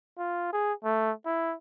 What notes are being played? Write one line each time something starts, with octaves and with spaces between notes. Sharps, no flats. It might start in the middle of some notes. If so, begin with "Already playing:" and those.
F4
G#4
A3
E4